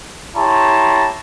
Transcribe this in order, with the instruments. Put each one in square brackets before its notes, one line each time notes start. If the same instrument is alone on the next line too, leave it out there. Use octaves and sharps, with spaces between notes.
[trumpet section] E4 G4 C#5 A5 A#5 C6